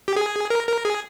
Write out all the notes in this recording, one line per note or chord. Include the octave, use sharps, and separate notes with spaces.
G4
G#4
A#4
A#4
G#4